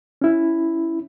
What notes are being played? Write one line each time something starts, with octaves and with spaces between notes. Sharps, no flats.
C#4 E4